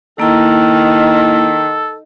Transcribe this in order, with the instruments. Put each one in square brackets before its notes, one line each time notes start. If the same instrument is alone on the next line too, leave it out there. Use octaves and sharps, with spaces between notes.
[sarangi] D#3 [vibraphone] A#3 E4 [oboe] A4